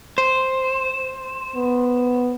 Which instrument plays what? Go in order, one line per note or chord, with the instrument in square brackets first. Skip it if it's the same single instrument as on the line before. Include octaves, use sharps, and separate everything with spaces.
[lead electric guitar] C5
[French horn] B3